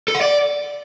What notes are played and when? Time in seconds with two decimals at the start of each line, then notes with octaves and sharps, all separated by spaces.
0.08 A4
0.15 F#5
0.21 D5